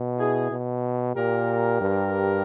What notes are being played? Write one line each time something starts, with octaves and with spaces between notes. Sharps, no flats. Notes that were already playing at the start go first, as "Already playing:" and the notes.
Already playing: B2
E4 G#4
B2
A#2 G4 A#4
G2